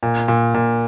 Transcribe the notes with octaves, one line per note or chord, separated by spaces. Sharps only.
A#2
A#2
A#2